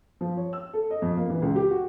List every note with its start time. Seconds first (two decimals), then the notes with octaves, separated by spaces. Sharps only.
0.21 F3
0.37 C#5
0.53 E6
0.73 A4
0.91 D#5
1.02 F2
1.17 A#3
1.30 E3
1.42 C#2
1.55 G4
1.71 F#4